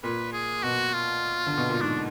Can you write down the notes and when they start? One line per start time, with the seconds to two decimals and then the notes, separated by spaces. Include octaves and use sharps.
0.03 A#2 B4
0.33 G#4
0.63 B2 F#4
0.93 F4
1.46 D3
1.57 B2
1.69 A#2
1.81 G#2 D4